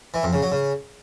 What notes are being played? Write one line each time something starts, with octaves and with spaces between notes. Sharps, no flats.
E3
F2
C#3
F#3
C#3